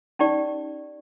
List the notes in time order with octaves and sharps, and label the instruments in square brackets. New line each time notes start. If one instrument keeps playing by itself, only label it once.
[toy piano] C#4 D#4 G4 D5